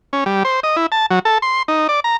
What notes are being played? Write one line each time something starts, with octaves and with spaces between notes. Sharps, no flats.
C#4
G3
C5
D#5
E4
A5
F#3
A4
C6
D#4
D5
A#5